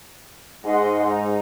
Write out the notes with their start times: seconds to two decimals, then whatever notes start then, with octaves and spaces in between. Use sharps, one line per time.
0.65 G#2 D#5 F#5 C6
1.06 D#4